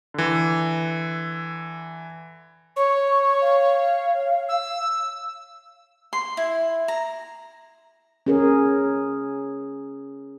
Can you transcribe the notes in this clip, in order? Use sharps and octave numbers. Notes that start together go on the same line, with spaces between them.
D3 E3
C#5 C#6
F5
E6
C6
E4
A#5
C#4 G#4 A#4